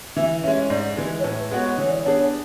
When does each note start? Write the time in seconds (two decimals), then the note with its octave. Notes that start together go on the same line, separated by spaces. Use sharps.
0.17 E3 E5
0.43 G#3 C#4 E5
0.70 G#2 D5
0.97 E3 G#3 B4
1.19 C#5
1.24 A2 B4
1.51 G#3 B3 F#4 C#5
1.78 E3 C#5
1.89 D5
2.00 C#5
2.05 B3 D4 G#4